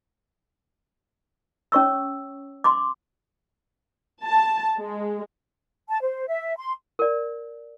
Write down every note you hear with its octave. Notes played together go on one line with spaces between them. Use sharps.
C#4 C#5 C#6 E6
C6 D6
A5
G#3
A5
C5
E5
C6
A#4 D5